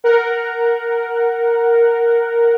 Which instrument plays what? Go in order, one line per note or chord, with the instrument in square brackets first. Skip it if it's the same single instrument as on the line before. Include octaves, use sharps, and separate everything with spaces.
[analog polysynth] A#4 F#5